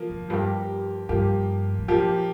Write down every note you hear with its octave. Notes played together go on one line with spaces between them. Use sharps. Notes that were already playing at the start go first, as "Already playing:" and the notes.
Already playing: F3 A#3
F2
G2 F3 A#3 G4
G2 F3 A#3 G4
G2
A#2 F3 A#3 G4